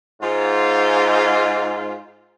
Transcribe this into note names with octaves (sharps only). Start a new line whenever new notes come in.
G#2 F4